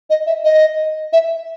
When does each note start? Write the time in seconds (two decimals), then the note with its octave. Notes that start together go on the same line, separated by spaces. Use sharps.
0.10 D#5
0.26 E5
0.44 D#5
1.13 E5